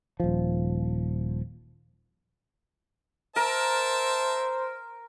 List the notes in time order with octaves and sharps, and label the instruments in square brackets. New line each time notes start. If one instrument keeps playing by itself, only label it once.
[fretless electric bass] D#1 F3
[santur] A#4 [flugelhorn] C5 [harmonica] E5 A5